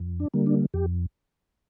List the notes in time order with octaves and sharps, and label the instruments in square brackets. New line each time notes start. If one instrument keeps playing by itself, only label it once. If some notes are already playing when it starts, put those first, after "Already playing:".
Already playing: [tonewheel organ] F2
D4
D3 G3 A#3
D4
F2 G4